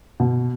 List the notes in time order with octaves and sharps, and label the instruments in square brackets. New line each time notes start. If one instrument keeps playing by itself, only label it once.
[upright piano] B2